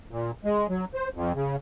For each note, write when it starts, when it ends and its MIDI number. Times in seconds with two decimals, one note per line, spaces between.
0.11 0.31 46
0.45 0.67 56
0.69 0.85 54
0.94 1.09 72
1.14 1.33 41
1.35 1.56 49